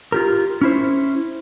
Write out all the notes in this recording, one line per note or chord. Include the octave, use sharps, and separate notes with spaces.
F4 G4 A#4
C#4 E4 C5